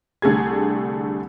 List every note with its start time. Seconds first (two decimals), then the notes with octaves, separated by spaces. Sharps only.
0.22 C2 D3 A3 G4 G#4 G#6